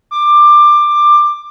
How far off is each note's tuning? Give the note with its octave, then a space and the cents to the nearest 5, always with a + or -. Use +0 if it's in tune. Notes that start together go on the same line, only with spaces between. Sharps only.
D6 +15